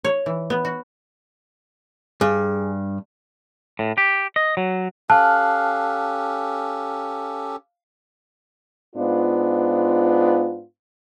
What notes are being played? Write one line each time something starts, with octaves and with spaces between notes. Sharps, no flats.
C#5
E3
B3
F#4
G2 G#4
A2
G4
D#5
F#3
C#4 G4 A4 F5 A5 F6 F#6
G#2 B3 D4 F4